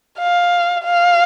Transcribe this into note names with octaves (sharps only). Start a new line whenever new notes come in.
F5
F5